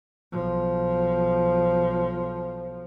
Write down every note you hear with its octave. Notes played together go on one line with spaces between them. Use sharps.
B1 F3